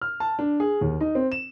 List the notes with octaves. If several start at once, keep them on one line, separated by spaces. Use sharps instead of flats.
F6
A5
D4
G#4
D#2
D#4
C4
E7